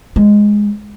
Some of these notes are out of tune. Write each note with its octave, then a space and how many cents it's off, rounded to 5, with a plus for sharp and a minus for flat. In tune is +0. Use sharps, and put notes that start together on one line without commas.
G#3 -5